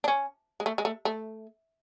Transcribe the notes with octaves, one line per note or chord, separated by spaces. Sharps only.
D4
C#4
G#3
A3
G#3
A3
A3